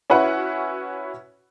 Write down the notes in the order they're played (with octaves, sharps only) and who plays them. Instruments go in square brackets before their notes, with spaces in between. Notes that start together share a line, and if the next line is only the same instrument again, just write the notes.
[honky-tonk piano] C#4 E4 F#4 B4 F#5